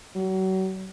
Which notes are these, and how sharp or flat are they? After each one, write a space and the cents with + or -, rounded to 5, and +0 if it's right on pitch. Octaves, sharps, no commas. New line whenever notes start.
F#3 +35